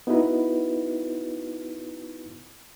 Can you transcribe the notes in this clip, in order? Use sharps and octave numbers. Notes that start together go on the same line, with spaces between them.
B3 D#4 E4 F#4 B4